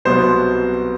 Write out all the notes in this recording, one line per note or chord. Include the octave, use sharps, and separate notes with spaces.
C2 B2 F#3 B3 C5